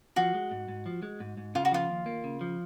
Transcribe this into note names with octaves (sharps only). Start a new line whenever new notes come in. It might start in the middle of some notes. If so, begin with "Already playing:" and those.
F3 F#4
G#3
G#2
G#2
F3
G#3
G#2
G#2
C#3 F4
F#4
F3 F4
D#2
A#3
C#3
F3